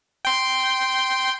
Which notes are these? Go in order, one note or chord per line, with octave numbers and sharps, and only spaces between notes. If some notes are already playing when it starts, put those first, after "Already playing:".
G5 C6